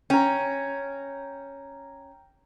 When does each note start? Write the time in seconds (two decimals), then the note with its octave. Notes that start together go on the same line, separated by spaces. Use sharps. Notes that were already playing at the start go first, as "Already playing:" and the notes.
0.10 C#4 G5 A#5